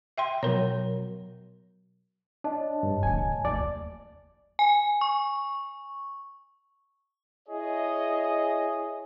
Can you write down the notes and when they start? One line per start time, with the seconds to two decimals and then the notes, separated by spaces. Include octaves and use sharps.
0.18 E5 G5 C6
0.43 B2 F#3 A#4 C#5
2.44 D4 C#5 D#5 A5
2.83 G2
3.03 D1 D2 G#5
3.45 D#2 A3 D5
4.59 G#5
5.01 C#6
7.48 E4 G#4 C#5 D#5